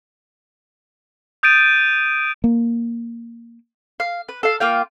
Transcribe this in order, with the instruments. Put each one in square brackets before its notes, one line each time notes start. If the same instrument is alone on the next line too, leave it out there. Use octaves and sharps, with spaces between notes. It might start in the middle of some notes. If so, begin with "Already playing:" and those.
[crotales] D#6 G6 A6 D7 D#7
[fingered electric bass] A#3
[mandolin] F5
B4
A4 F5
A#3 F4 F5 G5